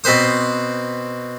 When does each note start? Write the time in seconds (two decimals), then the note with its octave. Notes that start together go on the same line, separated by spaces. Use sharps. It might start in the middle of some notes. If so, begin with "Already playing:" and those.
0.04 B2 C4 B4 C5 D#6